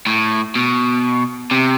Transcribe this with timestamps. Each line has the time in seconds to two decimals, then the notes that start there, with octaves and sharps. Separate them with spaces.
0.07 A2
0.55 B2
1.51 C3